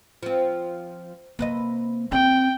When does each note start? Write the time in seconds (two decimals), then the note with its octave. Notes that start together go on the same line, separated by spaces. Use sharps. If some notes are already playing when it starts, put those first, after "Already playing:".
0.23 F3 C4
1.39 C3 A#3 B4 D#5
2.12 C4 G5